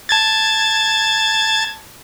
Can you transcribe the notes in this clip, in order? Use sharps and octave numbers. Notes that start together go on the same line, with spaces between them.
A5 G#6 A6